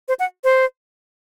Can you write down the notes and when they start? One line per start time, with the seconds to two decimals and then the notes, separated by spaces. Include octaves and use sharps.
0.08 C5
0.19 F#5
0.44 C5